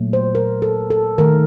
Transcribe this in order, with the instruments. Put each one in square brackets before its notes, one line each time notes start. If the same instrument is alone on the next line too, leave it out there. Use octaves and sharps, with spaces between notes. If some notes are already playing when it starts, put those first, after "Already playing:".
Already playing: [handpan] A#2 F#3 A3
C5
A#4
A4
A4
D#3 A3 A#4